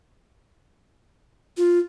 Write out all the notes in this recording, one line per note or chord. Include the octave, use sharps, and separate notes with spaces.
F4